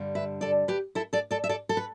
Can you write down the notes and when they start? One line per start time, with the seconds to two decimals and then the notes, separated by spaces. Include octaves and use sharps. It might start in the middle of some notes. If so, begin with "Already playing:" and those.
Already playing: G2 D3 G3
0.15 B4 E5
0.41 A4 D5
0.68 G4 B4
0.95 E4 A4
1.13 A4 D5
1.31 A4 D5
1.44 E5
1.49 A4 D5
1.69 A4
1.77 B4